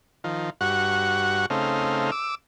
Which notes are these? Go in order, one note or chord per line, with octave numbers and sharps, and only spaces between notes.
D#3 F3
G2 F#4 F#5 C#6
C#3 A3 C4 D#4 F5
D6 E6